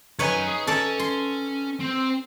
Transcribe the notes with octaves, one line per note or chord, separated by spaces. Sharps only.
F#2 D#4 B4 C#5 G#5
G#4
C#4 A4 D5
C6
C4